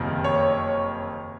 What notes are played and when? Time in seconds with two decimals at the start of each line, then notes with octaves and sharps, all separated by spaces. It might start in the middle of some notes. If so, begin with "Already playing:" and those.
Already playing: F#1 F2 C3 D#3
0.24 C#5